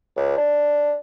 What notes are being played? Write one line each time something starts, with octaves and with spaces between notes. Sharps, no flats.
C#2
D4